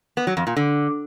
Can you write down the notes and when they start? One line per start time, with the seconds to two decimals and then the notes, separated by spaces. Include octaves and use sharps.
0.17 B3
0.27 F#3
0.37 F2
0.47 A#2
0.57 D3